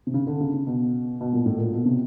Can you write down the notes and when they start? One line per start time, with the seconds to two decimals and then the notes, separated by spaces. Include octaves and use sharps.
0.07 C3
0.14 C#3
0.27 D3
0.41 C#3
0.54 C#3
0.67 B2
1.21 B2
1.33 A#2
1.46 A2
1.58 A#2
1.74 B2
1.85 C3